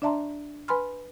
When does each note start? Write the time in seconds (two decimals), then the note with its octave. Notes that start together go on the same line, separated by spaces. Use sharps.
0.02 D4 D5 E5 A5 A#5 C6
0.68 B4 G#5 B5 C6 F6